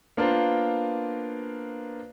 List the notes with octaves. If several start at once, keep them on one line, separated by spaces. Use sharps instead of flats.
A#3 B3 D4 F4 A#4 C5